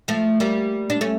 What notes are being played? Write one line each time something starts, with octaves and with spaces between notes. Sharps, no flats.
F3 A3
G3 A#3
D4
A3 C#4